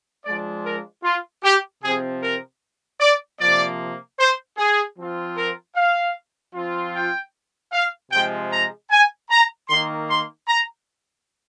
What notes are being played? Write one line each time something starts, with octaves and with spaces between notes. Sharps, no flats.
F3 G#3 D4 D5
A#4
F4
G4
C3 F3 C4 G#4
A#4
D5
C3 F3 A#3 D5
C5
G#4
F3 C4 F4
A#4
F5
F3 C4 F4
G5
F5
C3 F3 G#3 G5
A#5
G#5
A#5
D#3 A#3 D#4 C6
C6
A#5